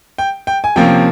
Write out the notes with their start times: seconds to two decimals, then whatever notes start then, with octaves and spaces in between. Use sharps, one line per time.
0.18 G5
0.47 G5
0.64 G#5
0.76 C3 F3 A#3 C#4 G5